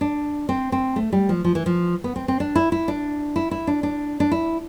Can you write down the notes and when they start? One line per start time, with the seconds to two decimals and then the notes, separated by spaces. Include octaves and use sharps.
0.01 D4
0.49 C4
0.72 C4
0.96 A3
1.12 G3
1.29 F3
1.44 F3
1.55 E3
1.66 F3
2.04 B3
2.16 C4
2.28 C4
2.40 D4
2.56 E4
2.72 E4
2.88 D4
3.36 E4
3.51 E4
3.67 D4
3.83 D4
4.20 D4
4.32 E4